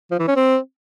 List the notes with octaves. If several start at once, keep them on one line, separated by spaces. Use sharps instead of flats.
F3
E3
C#4
C4